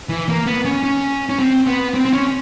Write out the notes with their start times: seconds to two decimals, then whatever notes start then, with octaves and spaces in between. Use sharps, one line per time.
0.09 E3
0.29 A#3
0.46 B3
0.65 C#4
0.83 C#4
1.29 C#4
1.40 C4
1.67 B3
1.94 C4
2.05 C4
2.13 C#4